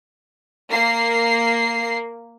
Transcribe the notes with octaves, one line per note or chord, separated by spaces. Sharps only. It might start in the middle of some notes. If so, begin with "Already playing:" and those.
A#3 C7